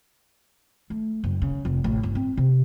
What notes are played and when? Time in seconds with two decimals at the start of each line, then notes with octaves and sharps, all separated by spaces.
0.90 A3
1.24 F#1
1.42 C#3
1.65 F1
1.84 A1
2.03 G1
2.15 C4
2.37 C3